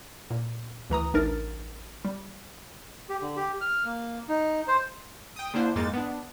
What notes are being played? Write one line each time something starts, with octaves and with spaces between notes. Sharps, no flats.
A#2
D2 E3 A#5 D#6
A1 D4 D#4 A#4 A6
G3
G4
D3
G4
F6
A#3
D#4
C5
G5 D#6
D3 A#3 D4 E4 C5
F2 G#2 G#3 A#3 D#4 A6
B3 D4